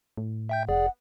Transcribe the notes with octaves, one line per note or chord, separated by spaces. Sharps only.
A2
E5 G5 G6
F1 G#4 D5 F#5